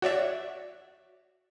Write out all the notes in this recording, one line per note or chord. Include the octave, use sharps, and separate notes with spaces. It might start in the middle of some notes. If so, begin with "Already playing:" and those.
F#4 C#5 D5 E5